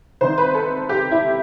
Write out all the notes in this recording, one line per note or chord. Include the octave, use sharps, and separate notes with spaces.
C2 C3 D#3 C5
B4
A4
G4
E4